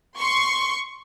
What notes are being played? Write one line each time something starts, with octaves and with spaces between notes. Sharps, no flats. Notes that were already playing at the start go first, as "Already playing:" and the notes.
C6 C#6